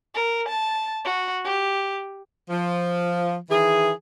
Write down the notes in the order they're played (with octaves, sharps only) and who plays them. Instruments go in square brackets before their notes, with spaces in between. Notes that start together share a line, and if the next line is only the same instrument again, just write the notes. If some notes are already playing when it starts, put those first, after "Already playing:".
[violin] A#4
A5
F#4
G4
[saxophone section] F3
D#3 E3 G#4